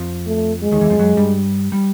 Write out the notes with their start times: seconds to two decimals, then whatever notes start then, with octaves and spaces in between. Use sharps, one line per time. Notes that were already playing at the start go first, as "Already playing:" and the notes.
Already playing: F2 F3
0.27 A3
0.63 G#3
0.72 D#2 D#3
0.81 E2 E3
0.90 F2 F3
0.98 F#2 F#3
1.16 G2 G3
1.72 G3